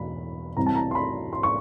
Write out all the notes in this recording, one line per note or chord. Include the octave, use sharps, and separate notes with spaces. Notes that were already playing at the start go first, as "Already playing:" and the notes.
Already playing: E1 B5
C2 C3 E3 G3 C4 A#5
A5
A#5
C6
B5
C6
C#6